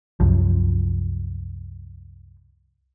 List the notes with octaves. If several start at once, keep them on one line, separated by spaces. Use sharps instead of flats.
C2 F#2 F3